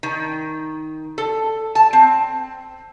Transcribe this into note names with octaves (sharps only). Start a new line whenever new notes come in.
D#3
A4
A5
C4